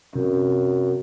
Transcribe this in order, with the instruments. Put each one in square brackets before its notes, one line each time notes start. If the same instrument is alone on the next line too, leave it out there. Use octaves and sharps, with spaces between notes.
[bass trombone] F#2 [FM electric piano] C3